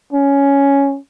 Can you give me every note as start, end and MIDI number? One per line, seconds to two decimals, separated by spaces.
0.13 0.98 61